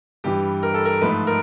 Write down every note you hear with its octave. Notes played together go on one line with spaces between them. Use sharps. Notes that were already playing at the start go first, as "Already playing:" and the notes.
G2 E3 G3 G4
A#4
A4
A#4
G#2 F3 A3 B4
A#4